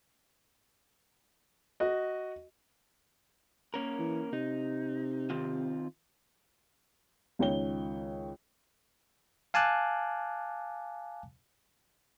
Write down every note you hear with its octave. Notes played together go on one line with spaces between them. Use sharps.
F#4 D#5
A#3 C#4 A#4
E3
C3 D#4
D#3 C4 F4
C#2 D#3 C#5 G5 G7
F5 G#5 A5 D6 F#6